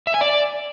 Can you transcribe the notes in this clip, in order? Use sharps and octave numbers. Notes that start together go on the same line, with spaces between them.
E5
G#5
D5